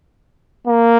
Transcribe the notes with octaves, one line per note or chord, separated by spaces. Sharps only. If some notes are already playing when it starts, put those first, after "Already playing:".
A#3